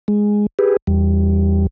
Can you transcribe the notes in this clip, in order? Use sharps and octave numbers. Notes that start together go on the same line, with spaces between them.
G#3
G4 G#4 B4
E2 G3